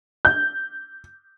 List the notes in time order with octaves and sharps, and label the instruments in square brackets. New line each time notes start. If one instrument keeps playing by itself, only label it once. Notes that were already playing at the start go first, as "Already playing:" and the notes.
[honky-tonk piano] G6